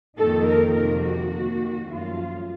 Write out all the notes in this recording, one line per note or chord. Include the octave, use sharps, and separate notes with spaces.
F2 D#3 A#3 D#4 A4
A#4
F2 C3 D#3 A#3 A#4
F#4
D#2 D#3 A#3
F#2 F3 A3 F4